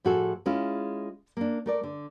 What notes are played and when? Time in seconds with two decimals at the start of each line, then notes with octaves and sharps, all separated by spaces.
0.05 A2 F3 F#4 G#4 A4
0.46 G#3 C#4 E4 F4
1.37 A#3 D4
1.66 A3 A#4 D5
1.83 D3